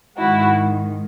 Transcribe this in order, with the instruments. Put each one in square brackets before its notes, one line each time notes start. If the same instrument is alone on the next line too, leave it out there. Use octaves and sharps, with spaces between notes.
[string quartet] G#2 D#3 G#3 E4 F#4